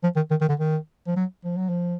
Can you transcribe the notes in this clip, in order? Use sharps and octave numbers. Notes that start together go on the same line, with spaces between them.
F3
D#3
D#3
D#3
D3
D#3
F3
F#3
F3
F#3
F3